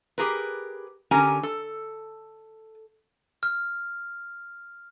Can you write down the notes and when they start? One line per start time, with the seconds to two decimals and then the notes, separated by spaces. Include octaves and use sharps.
0.18 G4 G#4 A#4 B4
1.11 D3 C#4 G4 A#4 G#5 A#5
1.43 A4
3.43 F6